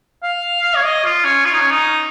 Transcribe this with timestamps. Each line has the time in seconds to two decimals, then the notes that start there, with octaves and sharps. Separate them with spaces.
0.23 F5
0.76 C#5
0.84 D#5
1.05 F4
1.24 C#4
1.45 F4
1.54 D#4
1.61 C#4
1.71 D#4